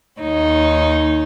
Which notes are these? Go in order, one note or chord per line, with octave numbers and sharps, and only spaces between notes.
D#2 D#4 C#5